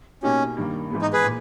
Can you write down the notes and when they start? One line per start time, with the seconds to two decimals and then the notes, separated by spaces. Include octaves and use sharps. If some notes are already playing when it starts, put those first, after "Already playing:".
0.23 B2 A#3 C#4 D#4 G4
0.57 G2 D#3 A#3
0.90 G#2 E3 G#3 B3
1.02 D#4
1.13 G#4 B4
1.24 A#2